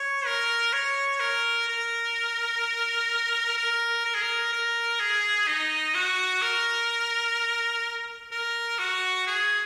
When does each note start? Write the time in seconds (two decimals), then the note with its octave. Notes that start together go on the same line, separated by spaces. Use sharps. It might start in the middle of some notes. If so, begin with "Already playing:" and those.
Already playing: C#5
0.26 A#4
0.73 C#5
1.20 A#4
1.68 A#4
3.57 A#4
4.05 A#4
4.14 G#4
4.22 A#4
4.53 A#4
5.00 G#4
5.47 D#4
5.95 F#4
6.42 A#4
8.32 A#4
8.78 F#4
9.27 G#4